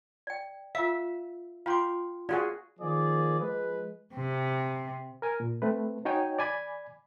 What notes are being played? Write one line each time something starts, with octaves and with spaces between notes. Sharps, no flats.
D5 G5
F4 E5 F5
F4 F5 G5 C6 D6
F4 F#4 G#4 D5
D#3 F3 A#3 G#4 D5
F3 G#3 B4
C3
A#4 G#5
A#2
A3 C4 B4
D#4 F#4 C#5 G5 G#5
D5 G#5 B5 G#6